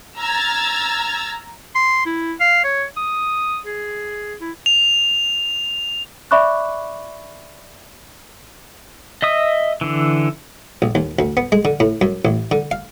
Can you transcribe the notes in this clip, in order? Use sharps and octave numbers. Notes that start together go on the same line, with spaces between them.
A#5 E6 F6 G#6 A6
C6
E4
F5
C#5
D#6
G#4
E4
F7
D5 E5 B5 C#6 D6 F#6
D#5 E5 D#6
D3 E3
A#1
D#2
D2
B3
G#3
D3
A2
F#2
A1
D3
F5